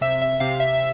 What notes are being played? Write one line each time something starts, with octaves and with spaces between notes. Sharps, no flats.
C3 E5
E5
C3 F5
E5